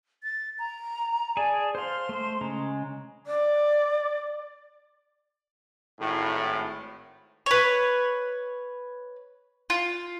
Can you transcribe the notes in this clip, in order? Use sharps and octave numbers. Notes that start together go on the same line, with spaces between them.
A6
A#5
G#4 D5 G#5 A5
C5 F5 C6
A3 C5
C#3 G#3 A#5
D5
G#1 A2
B4 C#5
F4